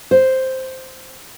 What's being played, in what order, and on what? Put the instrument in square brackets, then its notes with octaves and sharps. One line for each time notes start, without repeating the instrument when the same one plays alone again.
[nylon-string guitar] C5